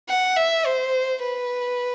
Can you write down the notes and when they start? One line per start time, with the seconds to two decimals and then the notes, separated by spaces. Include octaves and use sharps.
0.09 F#5
0.37 E5
0.65 C5
1.22 B4